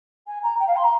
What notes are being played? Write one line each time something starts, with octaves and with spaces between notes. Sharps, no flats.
G#5
A#5
G5
F5
C6
A#5